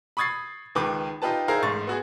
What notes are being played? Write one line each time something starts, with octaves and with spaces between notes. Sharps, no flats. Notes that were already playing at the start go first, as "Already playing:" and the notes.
B5 C#6 D#6 G#6 A6 C7
C#2 D#3 B4 G5 D6
D#4 F4 G4 B4 A5
D#4 E4 G#4 A#4 C5 F5
A1 G#2 C#6 A6
B3 F#4 G#4